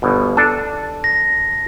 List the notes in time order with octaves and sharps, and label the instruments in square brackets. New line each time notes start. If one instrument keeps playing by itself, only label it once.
[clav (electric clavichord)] G1 B2
[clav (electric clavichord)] D4 A4 [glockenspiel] A5
[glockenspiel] A#6